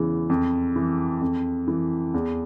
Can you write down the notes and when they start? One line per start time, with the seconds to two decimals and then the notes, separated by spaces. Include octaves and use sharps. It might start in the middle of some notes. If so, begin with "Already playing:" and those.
Already playing: E2 C#3 E3
0.30 F2
0.76 E3
1.22 F2
1.68 E3
2.14 E2